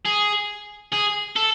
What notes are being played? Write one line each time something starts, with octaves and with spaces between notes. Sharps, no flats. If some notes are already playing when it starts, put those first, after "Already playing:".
G#4
G#4
A4